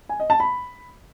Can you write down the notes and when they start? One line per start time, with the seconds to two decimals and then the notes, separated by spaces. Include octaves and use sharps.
0.09 G#5
0.20 D#5
0.30 A5
0.40 B5